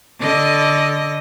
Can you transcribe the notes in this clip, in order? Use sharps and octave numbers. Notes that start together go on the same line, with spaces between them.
D3 D#5